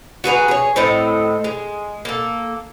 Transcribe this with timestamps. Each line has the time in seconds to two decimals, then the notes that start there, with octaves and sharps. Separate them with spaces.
0.24 F#4 G#4 B4 A#5
0.48 G#4 C#5
0.76 A2 C4 A4 D#5
1.44 G#3
2.05 A#3 A4